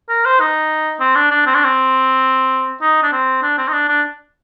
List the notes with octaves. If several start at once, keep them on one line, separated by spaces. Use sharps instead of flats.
A#4
C5
D#4
C4
D4
D4
C4
D4
C4
D#4
D4
C4
D4
C4
D#4
D4
D4